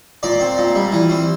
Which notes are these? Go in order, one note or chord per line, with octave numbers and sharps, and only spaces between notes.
A#2 D5
C4
A#2
G3
E3
C4